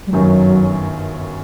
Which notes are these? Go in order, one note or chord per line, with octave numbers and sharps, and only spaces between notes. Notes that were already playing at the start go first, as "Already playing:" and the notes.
G3
G1 F#2 D#3 F#3